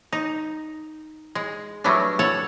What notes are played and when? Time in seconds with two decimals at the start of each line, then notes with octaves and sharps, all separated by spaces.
0.12 D#4
1.35 G#3
1.84 F#3 G3 A3 B3 C#4 D4
2.19 A4 C#5 F#5 A5